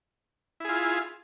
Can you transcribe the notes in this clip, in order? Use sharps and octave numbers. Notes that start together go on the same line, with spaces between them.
E4 F4 G#4